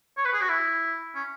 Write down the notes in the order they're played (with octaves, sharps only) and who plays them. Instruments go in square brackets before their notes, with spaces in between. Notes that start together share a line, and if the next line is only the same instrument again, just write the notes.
[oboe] C#5
B4
G#4
F#4
E4
C#4